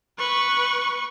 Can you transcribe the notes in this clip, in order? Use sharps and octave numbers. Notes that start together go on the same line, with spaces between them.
B4 C#6